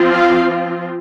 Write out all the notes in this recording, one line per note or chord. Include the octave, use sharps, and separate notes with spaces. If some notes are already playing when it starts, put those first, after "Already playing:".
Already playing: F3 C4 F4
F5